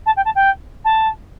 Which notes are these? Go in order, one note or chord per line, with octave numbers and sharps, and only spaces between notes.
A5
G5
A5
G5
A5